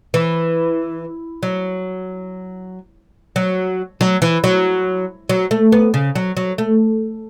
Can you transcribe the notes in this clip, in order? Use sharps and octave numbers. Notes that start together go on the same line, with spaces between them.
E3
F#3
F#3
F#3
E3
F#3
F#3
A3
B3
C#3
F#3
F#3
A3